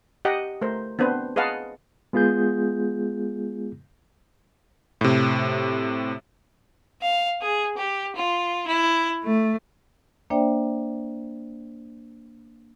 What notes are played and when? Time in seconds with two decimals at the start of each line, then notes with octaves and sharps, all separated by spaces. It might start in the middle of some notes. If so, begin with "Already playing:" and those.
0.25 G4 D#5 F#5 G5
0.61 A3 A#4 C5
0.99 B3 C4 D4 B4 C5
1.36 G#4 B4 D#5 F5 F#5 A5
2.13 G#3 B3 F4 G#4 G6
5.01 A2 C3
7.01 F5
7.41 G#4
7.76 G4
8.15 F4
8.67 E4
9.24 A3
10.30 A#3 D4 C5 D5 E5 G5